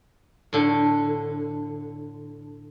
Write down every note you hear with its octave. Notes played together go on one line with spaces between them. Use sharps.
A2 D3